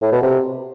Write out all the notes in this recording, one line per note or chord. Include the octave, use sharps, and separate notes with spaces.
A2
B2
C3